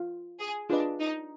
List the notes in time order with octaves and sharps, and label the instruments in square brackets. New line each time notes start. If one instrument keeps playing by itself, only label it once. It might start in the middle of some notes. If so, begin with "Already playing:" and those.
Already playing: [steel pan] F4
[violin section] G#4
[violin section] D4 [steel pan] F4 G#4 B4 D#5
[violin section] D#4